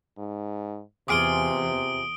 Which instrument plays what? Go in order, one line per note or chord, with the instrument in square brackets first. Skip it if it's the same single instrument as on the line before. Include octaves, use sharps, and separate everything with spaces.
[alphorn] G#2
[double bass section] E2 [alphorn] C3 [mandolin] F4 G#4 D6 [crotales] D#6 D7 G7